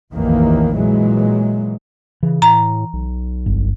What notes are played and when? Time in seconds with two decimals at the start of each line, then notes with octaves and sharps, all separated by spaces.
0.13 F1 A#1 D#2 D#3 E3 A#3
0.74 A#2 E3 F#3 G#3
2.23 C#3 E3
2.42 A2 A#5
2.93 B1
3.46 G1